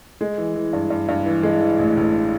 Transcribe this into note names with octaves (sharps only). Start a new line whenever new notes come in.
G#3
E3
E3
G2
G2
G2
E3
G#3
E3
A1
A1